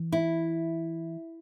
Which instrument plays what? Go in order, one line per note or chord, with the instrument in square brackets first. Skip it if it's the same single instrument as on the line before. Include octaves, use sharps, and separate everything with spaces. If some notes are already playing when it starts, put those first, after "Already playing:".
Already playing: [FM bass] E3
[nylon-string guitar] E4